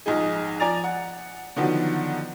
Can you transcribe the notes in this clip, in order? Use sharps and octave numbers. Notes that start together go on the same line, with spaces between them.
A#1 G#2 D#4 G#4
F3 D5 G#5 A#5 A6 F7
F#5
D3 D#3 F3 F#3 B3